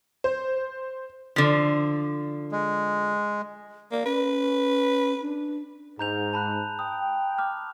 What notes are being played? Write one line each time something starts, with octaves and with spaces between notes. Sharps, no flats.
C5
D3 F3
G#3
A#3 D5
C#4 B4
D4
G#2 A#5 G6 F7
A5 B5 F#6
G5 D#6
D6 F6